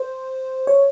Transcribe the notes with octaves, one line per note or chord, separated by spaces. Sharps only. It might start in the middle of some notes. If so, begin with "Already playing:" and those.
Already playing: C5
C#5